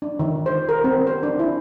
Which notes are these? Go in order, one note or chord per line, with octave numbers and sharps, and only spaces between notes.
D4
D#3
C5
A#4
C4
C5
D4
E4